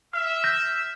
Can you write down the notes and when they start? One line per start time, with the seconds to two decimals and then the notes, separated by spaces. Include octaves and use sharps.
0.13 E5 F6
0.44 G6 A#6 E7